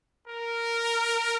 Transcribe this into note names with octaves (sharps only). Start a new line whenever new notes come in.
A#4